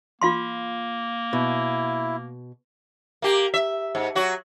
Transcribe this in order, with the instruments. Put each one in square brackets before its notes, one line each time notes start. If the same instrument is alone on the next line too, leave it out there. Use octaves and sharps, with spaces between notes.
[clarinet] A#3 [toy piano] F4 F5 C6
[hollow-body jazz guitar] B2 [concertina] E4
[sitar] A#3 G4
E5
G#2
F#3 F#4